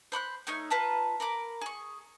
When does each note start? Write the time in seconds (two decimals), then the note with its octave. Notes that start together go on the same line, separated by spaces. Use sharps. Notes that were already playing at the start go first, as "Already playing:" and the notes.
0.12 C5 B5 C#6 F#6
0.47 A3 D#4 C#5 F6
0.70 F4 B4 A5 A#5
1.20 A#4 B5 D6
1.61 G#4 C#6